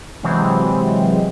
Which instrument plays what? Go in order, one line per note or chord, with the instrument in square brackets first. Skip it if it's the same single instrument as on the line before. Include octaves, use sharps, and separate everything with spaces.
[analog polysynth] C3 E3 F#3 G#3 C4